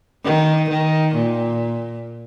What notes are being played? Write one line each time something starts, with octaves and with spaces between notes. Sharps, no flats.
D#3
D#3
A#2